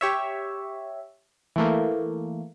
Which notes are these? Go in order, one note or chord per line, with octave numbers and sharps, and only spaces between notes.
G4 C#5 E5
E3 A3 A#3